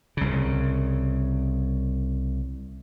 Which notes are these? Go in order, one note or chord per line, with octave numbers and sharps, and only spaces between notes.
C2 C#3